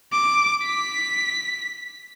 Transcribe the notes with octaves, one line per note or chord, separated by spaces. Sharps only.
D6
B6